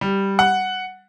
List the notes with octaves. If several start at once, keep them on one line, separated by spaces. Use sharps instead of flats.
G3
F#5